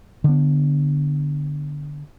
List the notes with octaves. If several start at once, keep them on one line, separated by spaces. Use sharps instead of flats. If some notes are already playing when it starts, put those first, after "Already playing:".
D3 B3